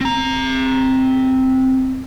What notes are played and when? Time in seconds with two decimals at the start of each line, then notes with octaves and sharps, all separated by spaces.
0.01 C4 A#5